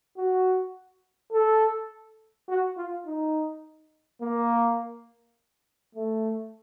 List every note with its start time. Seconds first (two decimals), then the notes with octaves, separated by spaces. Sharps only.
0.17 F#4
1.33 A4
2.48 F#4
2.77 F4
3.06 D#4
4.22 A#3
5.95 A3